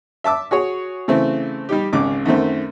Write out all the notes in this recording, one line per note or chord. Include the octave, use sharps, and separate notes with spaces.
E5 A5 D6 E6
F#4 G#4 C#5
C#3 E3 A3 C4
G3 D#4 G4
G#1 C#2 C#3 D6
F#2 D#3 A3 C4